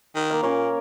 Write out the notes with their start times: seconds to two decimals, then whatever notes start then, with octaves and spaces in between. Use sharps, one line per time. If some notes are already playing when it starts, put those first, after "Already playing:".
0.15 D#3
0.31 A#3 F5
0.43 A#2 C#4 A#4 C#5